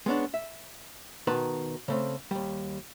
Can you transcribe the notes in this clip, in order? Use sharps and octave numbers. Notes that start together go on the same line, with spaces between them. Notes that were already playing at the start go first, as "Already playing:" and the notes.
G#3 B3 C#4 D4
E5
B2 D#3 B4 A5 A#5 C6
C#3 A3 C4
D#2 G3